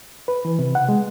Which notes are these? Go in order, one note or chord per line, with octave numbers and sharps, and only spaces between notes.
B4
E3
C3
F#5
G#3